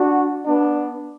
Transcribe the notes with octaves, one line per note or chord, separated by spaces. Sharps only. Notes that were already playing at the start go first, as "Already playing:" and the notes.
Already playing: D4 F#4
B3 D4